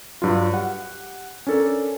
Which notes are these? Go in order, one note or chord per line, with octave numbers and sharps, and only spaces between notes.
G2 F#3 F4
G4 F#5
C#4 D4 A4 A#4